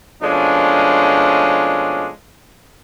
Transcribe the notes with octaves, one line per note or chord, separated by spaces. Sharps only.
B2 F3 G#3 A3 C#4 D4